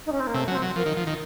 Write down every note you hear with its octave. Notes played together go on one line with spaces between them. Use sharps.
D#4
C#4
C4
A#3
C3 A3
F#3 C#4
C4
F#3
F3 A#4
D#3
F3
D#3